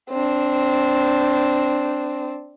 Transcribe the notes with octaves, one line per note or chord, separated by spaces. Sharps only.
C4 D4